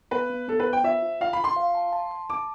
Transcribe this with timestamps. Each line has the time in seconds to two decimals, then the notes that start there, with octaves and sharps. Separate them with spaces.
0.11 B3 B4
0.30 B3
0.48 B3 A4
0.60 B4
0.67 C5
0.73 G5
0.84 F4 E5
1.02 F4
1.21 F4 F5
1.33 B5
1.38 F4
1.44 C6
1.56 F5
1.75 A5
1.93 A5
2.11 A5
2.30 A5 D6